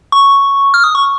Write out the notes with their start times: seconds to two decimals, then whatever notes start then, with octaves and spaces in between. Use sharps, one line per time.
0.12 C#6
0.74 F6
0.84 D#6
0.95 C#6